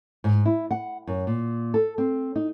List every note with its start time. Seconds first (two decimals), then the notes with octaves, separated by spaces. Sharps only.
0.24 G#2
0.45 E4
0.71 F#5
1.07 F#2
1.27 A#2
1.74 A4
1.98 C4
2.36 D#4